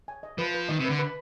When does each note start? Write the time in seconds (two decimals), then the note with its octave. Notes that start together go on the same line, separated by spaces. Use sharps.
0.08 G#5
0.23 D#5
0.38 F3 B4
0.54 B4
0.69 D#3 D#5
0.79 C3
0.85 D3 B4
0.99 B4